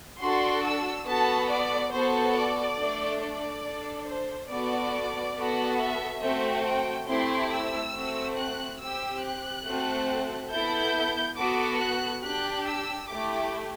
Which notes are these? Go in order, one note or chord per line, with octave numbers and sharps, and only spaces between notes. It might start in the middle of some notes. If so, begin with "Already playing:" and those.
D4 F#4 A4 C6
E6
B3 F#4 A4 A5
D5
B3 F#4 A4 C5
D5
A3 D4 A4
D5
D4 A4
C5
B3 F#4 A4 D5
B3 F#4 A4
E5
A3 C4 F#4 E5
G5
A3 C4 E4 G4 C6
E6
A3 C4 F#4
F#6
C4 G4 E6
F#6
A3 C4 F#4 A4
B3 E4 A4 G6
B3 F#4 A4 D6
F#6
D4 G4 F#6
E6
A3 E4 G4 D6